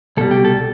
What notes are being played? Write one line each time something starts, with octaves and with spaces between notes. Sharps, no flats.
C2 B2 G3 A4
G4
A4